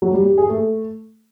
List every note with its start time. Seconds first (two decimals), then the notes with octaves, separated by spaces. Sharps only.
0.02 F#3
0.14 G3
0.26 G4
0.38 G#4
0.49 A3